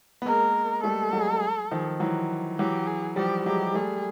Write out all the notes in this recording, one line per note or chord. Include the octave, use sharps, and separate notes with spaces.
B3
G#3 A#3 A#4
G3 A3 A4
F#3 G#3
D#3 F3
E3 F#3
E3 F#3 G4
G#4
F3 G3 G4
F#3 G#3 G4
G3 A3 G#4